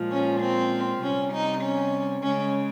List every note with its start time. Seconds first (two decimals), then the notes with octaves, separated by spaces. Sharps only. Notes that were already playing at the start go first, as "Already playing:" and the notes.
Already playing: A#2 F3 G#3
0.12 C#4
0.41 C4
1.02 C3 G3 C#4
1.33 D#4
1.62 C#4
2.23 C#3 G#3 C#4